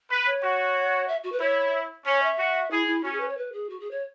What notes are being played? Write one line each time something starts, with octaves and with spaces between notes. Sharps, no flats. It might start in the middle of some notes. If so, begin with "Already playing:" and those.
B4
C#5
F#4
E5
F#4
B4
E4 C#5
C#4 C#5
E5
F#4
E4 G#4
E4
C#4 F#4
G#4
B4
C#5
B4
G#4
F#4
G#4
C#5